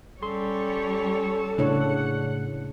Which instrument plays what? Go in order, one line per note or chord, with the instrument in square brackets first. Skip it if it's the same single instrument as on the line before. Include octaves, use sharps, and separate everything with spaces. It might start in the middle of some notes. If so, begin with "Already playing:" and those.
[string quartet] G3 C#4 C#5 [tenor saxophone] A4 [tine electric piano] C6
[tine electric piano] A2 [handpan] C#3 D4 C#5 [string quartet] F#5